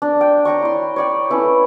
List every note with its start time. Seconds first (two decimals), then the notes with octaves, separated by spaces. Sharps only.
0.02 D4
0.21 G5
0.45 C#5 G5 A#5 C#6
0.62 E4 C6
0.96 C#5 D5 G5
1.30 A3 C#4 E4 B4